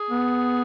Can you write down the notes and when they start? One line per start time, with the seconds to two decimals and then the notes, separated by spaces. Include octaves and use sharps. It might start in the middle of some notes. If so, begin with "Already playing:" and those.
Already playing: G#4
0.11 B3